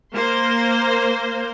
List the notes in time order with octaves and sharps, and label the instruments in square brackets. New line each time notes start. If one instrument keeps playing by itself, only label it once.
[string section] A#3 C5